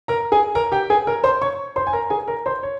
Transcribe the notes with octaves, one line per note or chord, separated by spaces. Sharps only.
A#4 A#5
G#4 G#5
A#4 A#5
G4 G5
G#4 G#5
A#4 A#5
C5 C6
C#5 C#6
C5 C6
G#5
A#4 A#5
G#4 G#5
A#4 A#5
C5 C6
C#5